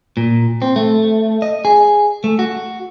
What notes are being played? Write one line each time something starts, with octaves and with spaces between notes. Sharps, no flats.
A#2
C4
A3
D#5
G#4
A3
F#4